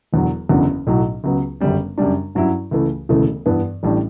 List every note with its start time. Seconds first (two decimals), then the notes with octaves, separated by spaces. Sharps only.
0.12 E1 E2 D3 F#3
0.49 F#1 E2 D3 F#3 C#4
0.87 B1 A2 F#3
1.24 C#2 C#3 F#3 B3
1.60 G1 F#2 C#3 G3 C#4
1.98 F#2 C#3 G3 D4
2.35 G2 F#3 C#4 E4
2.71 C#2 C#3 E3 A3
3.09 E1 D2 C#3 E3 A3
3.46 G2 E3 B3
3.83 A1 A2 G3 D4